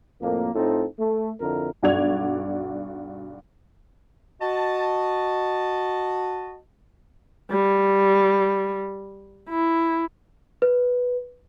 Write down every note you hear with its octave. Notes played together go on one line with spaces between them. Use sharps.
F2 A2 A#3
A2 C4 D#4 F4 A4
A3
F2 D3 E4 A#4
B1 G2 F#4 D5 G#6 F7
F#4 D#5 A5
G3
E4
B4